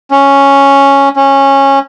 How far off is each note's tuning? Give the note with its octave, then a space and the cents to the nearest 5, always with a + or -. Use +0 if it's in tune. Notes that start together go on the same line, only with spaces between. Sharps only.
C#4 +0
C#4 -15